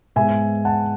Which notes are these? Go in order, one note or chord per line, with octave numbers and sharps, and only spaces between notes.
G#2 G#3 B3 E5 G#5
F#5 A5